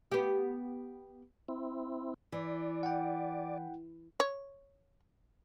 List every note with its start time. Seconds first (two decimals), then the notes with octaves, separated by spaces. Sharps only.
0.12 B3 G4
1.48 C4 E4
2.32 E3 D5
2.83 F#5 G5
4.20 C#5